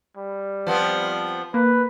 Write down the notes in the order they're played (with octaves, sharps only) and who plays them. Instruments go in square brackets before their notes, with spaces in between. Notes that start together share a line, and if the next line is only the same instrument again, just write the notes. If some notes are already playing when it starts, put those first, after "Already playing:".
[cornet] G3
[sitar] F3 B3 C4
[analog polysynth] A#3 [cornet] B4